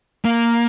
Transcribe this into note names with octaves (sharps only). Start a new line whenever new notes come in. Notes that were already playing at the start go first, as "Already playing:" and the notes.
A#3